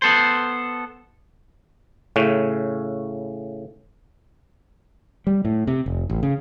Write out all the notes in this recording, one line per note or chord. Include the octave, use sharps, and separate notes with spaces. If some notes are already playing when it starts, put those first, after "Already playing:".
B3 A4 C5
A2 C#3 C#4
G3
A2
C3
F1
A1
C#3